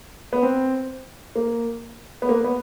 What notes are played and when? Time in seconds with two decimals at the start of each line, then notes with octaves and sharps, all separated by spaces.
0.33 B3
0.43 C4
1.35 A#3
2.22 B3
2.29 A#3
2.44 B3